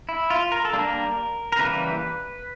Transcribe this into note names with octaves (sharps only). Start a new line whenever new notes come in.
E4
F4
A#4
A4
G3 A#3 D4
A#4
A#4
C#3 E3 G3 A#3 B4